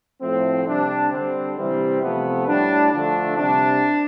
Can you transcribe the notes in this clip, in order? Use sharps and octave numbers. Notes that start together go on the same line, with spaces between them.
A2 F3 A3 C4
C3 G3 D4
D3 G3 C4
C3 E3 G3 C4
C3 F3 A3 B3
A2 G3 D4
D3 F3 A3 D4
C3 G3 D4